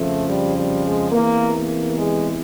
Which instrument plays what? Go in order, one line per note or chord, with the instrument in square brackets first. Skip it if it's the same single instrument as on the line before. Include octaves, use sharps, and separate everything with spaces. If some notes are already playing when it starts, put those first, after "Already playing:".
Already playing: [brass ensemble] F2 C#3 F3 A3
G3
G3
G#3
E2 C3 E3 A#3
A#3
G#3